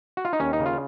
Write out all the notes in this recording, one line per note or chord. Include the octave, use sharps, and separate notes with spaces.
F#4
F4
D#4
D#2 C#4
D#4
C#3
F4